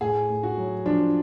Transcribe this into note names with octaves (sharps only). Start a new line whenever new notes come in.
A2 G#4
A2
F#4
F#3
F3 D4